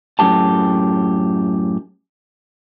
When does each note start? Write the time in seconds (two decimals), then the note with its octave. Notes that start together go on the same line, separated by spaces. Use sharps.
0.19 F#2 A2 G4 A5